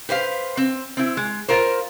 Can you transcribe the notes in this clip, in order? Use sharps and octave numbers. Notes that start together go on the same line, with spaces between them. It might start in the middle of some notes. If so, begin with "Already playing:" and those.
G4 B4 C5 F5
C4
C4 E4
G#3
F4 A#4 C5